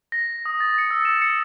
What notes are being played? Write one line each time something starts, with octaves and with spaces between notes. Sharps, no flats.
A#6
D#6
A6
C#7
E6
E7
C#7